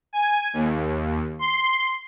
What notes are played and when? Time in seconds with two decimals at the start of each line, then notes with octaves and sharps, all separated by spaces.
0.13 G#5
0.53 D#2
1.39 C6